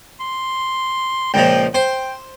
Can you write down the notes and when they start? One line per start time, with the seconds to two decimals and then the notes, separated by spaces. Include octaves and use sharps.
0.20 C6
1.34 C#2 A#2 F3 G5
1.75 C5 G5 C6